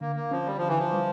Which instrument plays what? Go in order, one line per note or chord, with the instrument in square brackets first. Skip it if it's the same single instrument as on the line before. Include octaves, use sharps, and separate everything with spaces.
[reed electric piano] D3 [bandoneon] A#3
[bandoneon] A#3
[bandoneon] F3 [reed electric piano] C#4
[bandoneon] G3
[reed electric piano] D3 [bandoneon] F3
[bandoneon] E3
F3
[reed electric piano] G3